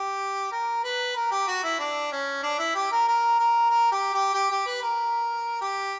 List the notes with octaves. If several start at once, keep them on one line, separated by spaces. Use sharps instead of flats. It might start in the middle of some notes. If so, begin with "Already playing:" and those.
Already playing: G4
A#4
B4
A#4
G4
F#4
E4
D4
C#4
D4
E4
G4
A#4
A#4
A#4
A#4
G4
G4
G4
G4
B4
A#4
G4